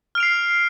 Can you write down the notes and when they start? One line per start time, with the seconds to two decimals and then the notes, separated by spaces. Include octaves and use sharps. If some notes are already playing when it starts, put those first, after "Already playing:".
0.15 F6
0.18 D7
0.20 F7
0.23 C7